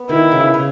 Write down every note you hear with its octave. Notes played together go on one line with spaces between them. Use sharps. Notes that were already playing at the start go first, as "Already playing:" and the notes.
Already playing: B3
D#3 E4
C#3
C#3